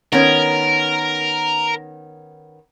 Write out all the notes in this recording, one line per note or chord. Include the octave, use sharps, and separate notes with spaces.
D#3 B3 C#4 A#4